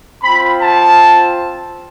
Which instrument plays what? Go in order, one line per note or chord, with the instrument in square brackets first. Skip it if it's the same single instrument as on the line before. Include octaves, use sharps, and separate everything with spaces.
[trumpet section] C4 F4 B5
A5